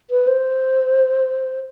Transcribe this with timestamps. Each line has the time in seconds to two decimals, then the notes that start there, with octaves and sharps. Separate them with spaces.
0.10 B4
0.27 C5